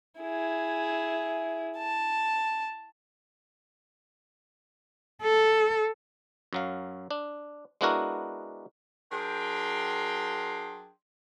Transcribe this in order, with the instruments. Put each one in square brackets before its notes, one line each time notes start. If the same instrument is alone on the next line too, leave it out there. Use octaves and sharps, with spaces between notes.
[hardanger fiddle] E4 G#4
A5
[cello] A4
[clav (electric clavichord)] F#2 F#3 F5
D4
G#3 B3 D4 E4 F#4 A#4
[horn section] F#3 D4 G#4 A#4 G5 C6